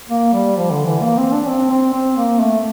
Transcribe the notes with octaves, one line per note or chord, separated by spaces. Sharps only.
A#3
G3
F3
D3
E3
A#3
C4
D4
C4
C4
C4
A#3
A3